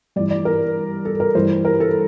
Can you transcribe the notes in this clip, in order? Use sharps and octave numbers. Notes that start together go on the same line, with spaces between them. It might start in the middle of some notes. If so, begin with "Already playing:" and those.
G2 E3 D5
D5
A#4
A4
A#4
G2 E3 C5
A#4
A4